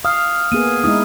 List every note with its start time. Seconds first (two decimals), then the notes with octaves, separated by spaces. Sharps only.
0.05 F5 D#6 F6
0.52 A#3 B3 G#4 D#7
0.84 G#3 D#4 E4 D#6